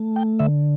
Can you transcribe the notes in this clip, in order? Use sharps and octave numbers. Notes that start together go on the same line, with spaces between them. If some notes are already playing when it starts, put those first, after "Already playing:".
Already playing: A3
G5
D3 E5